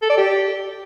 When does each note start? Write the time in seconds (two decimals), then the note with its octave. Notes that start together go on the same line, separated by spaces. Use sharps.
0.02 A4
0.10 D5
0.17 G4